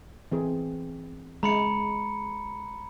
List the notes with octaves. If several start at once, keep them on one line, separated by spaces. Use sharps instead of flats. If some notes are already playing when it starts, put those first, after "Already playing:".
E3 C4 G#4
G#3 A#5 B5 C#7